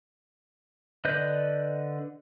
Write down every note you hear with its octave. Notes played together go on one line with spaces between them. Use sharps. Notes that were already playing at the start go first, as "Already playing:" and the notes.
D3 B4 D5 D#5 G6